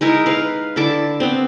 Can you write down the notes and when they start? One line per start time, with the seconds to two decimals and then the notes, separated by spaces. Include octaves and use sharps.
0.01 G#3 D#4 E4 A#4
0.26 B4 F5
0.76 D3 E4 A5 D6
1.20 B3 C4